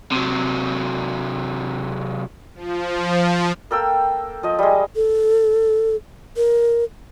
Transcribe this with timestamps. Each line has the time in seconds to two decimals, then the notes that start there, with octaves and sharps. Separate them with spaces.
0.12 C3 F#3
2.55 F3
3.71 A#3 A4 G5 E6
4.43 F3 D#5
4.59 G3 G#3
4.95 A4
6.37 A#4